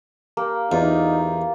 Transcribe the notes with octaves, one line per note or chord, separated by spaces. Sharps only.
A#3 G4 A#4
E2 D#4 F4